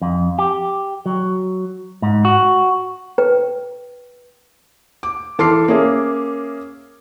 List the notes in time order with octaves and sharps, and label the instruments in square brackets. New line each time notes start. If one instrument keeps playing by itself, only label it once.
[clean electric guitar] F2
G4
F#3
G#2
F#4
[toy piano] B4 G5
[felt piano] D6
E3 A4 C6 D6 F6 C7
A#3 C#4 G#4 E5